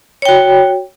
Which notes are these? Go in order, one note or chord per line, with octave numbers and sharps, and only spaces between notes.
F#4 C#5 G5